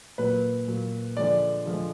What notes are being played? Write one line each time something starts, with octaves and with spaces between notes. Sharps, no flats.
A#2 F#3 A#3 B4
A#2 F#3 A#3
D3 F3 G#3 D5
D3 F3 G#3